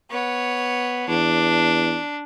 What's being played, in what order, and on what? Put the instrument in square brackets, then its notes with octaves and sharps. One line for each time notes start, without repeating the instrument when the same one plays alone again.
[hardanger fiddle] B3 C#5
[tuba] E2 [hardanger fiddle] D4